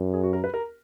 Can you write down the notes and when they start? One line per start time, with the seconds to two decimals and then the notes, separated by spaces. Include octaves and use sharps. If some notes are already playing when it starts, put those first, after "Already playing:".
Already playing: F#2
0.14 G#4
0.23 F#4
0.33 A#4
0.44 B4
0.54 A#4